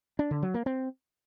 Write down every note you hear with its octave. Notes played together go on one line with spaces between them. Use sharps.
D4
D3
F#3
A#3
C4